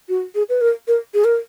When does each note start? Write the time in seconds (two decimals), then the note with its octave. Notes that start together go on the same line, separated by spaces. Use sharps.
0.09 F#4
0.35 G#4
0.49 B4
0.61 A#4
0.88 A#4
1.14 G#4
1.25 A#4